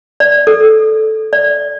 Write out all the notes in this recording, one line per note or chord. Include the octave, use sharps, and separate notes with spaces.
D5
A4
D5